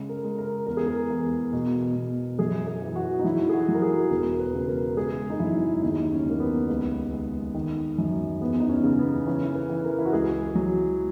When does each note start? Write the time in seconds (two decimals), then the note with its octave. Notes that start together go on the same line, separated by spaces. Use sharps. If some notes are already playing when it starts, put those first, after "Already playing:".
Already playing: C#3 G#3
0.09 A#4
0.24 G#3
0.38 A#4
0.67 E2 A#4
0.77 G#4
0.86 A#4
1.10 E2
1.53 B2
1.96 B2
2.39 F#2 G#4
2.67 G#4
2.82 E3
2.96 F#4
3.19 D#4
3.24 F#3 E4
3.49 G#4
3.53 F#4
3.68 F#3
3.75 A#4
3.82 G#4
4.11 E1 A#4
4.39 B4
4.54 C#3
4.68 A#4
4.97 G#3 G#4
5.30 D#4
5.40 F#2 E4
5.82 D#2 D#4
6.12 C#4
6.25 D#2 A#3
6.40 B3
6.69 C#2
7.12 G#3
7.55 D#3
7.98 F#2
8.40 E2 B3
8.60 D#4
8.69 C#4
8.84 C#3
8.99 B3
9.26 E3 C#4
9.55 B4
9.70 E3
9.85 A#4
9.99 E4
10.05 F#4
10.13 C#2 G#4
10.55 F#3